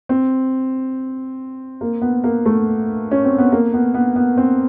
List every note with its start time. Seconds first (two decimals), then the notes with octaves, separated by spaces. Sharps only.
0.09 C4
1.81 A#3
2.02 B3
2.24 A#3
2.46 A3
3.11 C#4
3.25 C4
3.38 B3
3.52 A#3
3.74 B3
3.94 B3
4.16 B3
4.37 C4